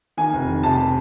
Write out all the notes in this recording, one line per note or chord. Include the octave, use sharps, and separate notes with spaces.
D#3 G#5
F1
D#3
C3 A5